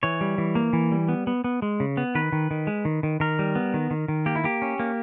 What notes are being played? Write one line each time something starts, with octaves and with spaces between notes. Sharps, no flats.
E3 C#5
G3
E3
A#3
E3
G3
B3
B3
B3
G#3
C#3
B3
D#3 B4
D#3
D#3
G#3
D#3
D#3
D#3 A#4
G3
B3
D#3
D#3
D#3
A#3 G4
E4
A#3 G4
C#4
A#3